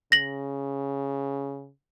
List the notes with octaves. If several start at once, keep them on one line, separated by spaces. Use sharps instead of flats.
C#3 A#6 F#7